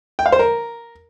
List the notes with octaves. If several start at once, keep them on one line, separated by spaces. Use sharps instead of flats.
G5
F5
C5
A#4